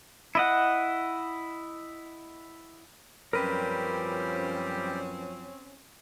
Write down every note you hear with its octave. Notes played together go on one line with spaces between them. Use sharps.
E4 D#5 F#5
F#2 F3 G3 C4 C#4 G4 A#4 B4